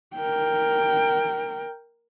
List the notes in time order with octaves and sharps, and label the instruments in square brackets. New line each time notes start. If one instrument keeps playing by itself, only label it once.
[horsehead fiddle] A#4 G5